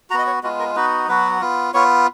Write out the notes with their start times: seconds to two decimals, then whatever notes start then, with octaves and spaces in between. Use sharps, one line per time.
0.10 F#4 A#5
0.14 B3 D#5
0.26 C#5
0.43 G#3 B3 F4 F#4
0.60 A#4
0.76 B3 D#4 F#4 B4
1.08 F#3 B3 F#4 B4
1.41 B3 F4
1.74 B3 F4 C#5